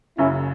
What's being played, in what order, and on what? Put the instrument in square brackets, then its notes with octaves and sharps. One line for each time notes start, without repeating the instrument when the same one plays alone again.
[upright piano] F#1 F#2 C#3 [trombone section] C#4 E4